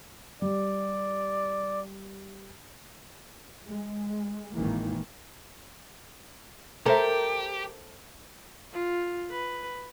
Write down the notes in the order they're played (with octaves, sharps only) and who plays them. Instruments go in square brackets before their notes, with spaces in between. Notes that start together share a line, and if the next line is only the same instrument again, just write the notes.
[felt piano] G3 [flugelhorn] D5
[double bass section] G#3
G#1 A2 D#3 E3 A#3
[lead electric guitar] G4 [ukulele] A4 C5 E5 [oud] A#4
[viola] F4
B4